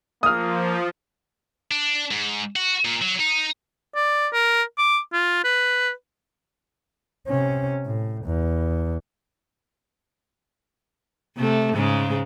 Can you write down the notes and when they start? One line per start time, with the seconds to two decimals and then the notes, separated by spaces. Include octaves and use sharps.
0.23 F3 A#3 D#6 F6
1.71 D4
2.11 G#2
2.56 F#4
2.85 A#2
3.01 F#3
3.19 D#4
3.95 D5
4.33 A#4
4.78 D6
5.13 F4
5.44 B4
7.28 C3 C#4
7.86 A2
8.24 E2
11.37 C3 A3
11.74 G#2 C#3 G#3